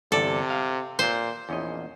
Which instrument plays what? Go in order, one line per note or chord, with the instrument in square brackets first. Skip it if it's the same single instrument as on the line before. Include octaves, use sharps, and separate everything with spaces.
[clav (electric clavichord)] G1 E2 D5 [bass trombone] C3 [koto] A4
[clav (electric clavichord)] F5
[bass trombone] A#2 [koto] C5
[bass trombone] A#1 [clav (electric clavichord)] E2 C#4 D#5